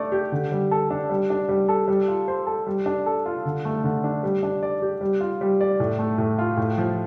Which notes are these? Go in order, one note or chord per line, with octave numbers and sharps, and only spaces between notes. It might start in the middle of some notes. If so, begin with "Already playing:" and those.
Already playing: A3 D4 D5
G4
D3
G3
A4
D4
G3
D4
G3
A4
G3
F4
C5
A4
G3
D4
A4
F4
D3
A3
D3
D4
G3
D4
D5
G4
G3
F4
G3
D5
A2
A3
A2
F4
A2
F3